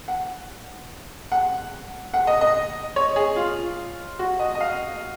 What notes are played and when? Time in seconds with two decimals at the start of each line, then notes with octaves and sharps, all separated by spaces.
0.08 F#5
1.32 F#5
2.14 F#5
2.27 D#5
2.41 D#5
2.96 C#5
3.16 G#4
3.36 F4
4.19 F#4
4.39 D#5
4.55 D#5
4.61 F5